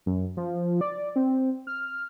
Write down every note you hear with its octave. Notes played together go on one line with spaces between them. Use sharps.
F#2
F3
D5
C4
F6